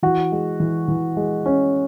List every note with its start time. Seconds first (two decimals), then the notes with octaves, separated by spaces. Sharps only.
0.03 E3 F#4
0.32 G#3
0.60 E3
0.88 E3
1.17 G#3
1.46 C#4